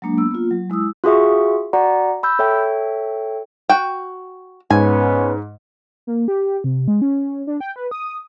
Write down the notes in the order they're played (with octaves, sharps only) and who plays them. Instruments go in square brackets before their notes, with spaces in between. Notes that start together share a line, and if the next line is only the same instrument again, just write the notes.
[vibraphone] F#3 G#3 A#3 D4
B3 E6
A#3 F4
F#3
G#3 E4 D#6 E6
[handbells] F4 F#4 G#4 E5 C#6
F#4 D5 F#5 A#5
B5 E6 G6
A4 C#5 E5 G5
[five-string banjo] F#4 G5
[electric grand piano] G#2 [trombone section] B3 C#4 [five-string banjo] G#5
[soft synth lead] A#3
G4
C3
G#3
C#4
D4
G5
B4
D#6